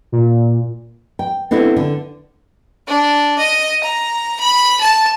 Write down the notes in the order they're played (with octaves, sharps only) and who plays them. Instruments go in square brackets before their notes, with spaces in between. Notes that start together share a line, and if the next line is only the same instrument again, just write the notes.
[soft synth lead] A#2
[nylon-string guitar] G5
B3 C4 D4 E4 A4
D3
[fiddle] D4
D#5
A#5
B5
A5